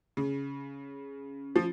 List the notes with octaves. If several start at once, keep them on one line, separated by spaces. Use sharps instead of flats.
C#3
F3